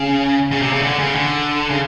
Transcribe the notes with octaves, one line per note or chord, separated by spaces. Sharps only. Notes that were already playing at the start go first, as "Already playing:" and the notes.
Already playing: C#3
C#3
C3
C#3
D3
C#3
D3
C#3